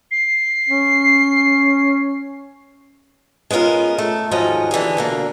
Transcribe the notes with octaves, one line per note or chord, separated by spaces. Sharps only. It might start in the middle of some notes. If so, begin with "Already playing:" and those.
C7
C#4
G#3 B3 C#4 F4 A#4
A3
D#2 G#2 F3 F#3 C#4 D#5
D3 E3 G4 G#4
B2 D3 A#3